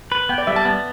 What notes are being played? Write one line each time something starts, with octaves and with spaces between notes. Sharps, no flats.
B4
B3 G5
D5
G3 E5
A5
B3